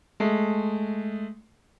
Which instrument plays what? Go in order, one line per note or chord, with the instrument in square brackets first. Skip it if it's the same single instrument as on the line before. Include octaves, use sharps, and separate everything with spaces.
[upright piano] G#3 A3